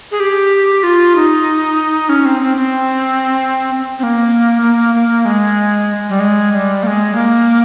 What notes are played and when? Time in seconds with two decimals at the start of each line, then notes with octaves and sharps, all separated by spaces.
0.11 G#4
0.20 G4
0.83 F4
1.16 D#4
2.09 C#4
2.25 C4
2.42 C4
2.57 C4
3.99 C4
4.03 A#3
4.62 A#3
4.94 A#3
5.25 G#3
6.10 G3
6.20 G#3
6.51 G#3
6.55 G3
6.83 A#3
6.87 G#3
7.15 A#3